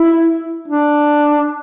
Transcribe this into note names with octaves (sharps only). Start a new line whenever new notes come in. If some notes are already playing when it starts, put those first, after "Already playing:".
Already playing: E4
D4